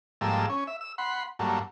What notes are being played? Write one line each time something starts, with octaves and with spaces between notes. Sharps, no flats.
G#2 F3 G3 A#3 A4 E6
C#4
E5
E6
F#5 B5 C6
G2 F#3 A3 A#3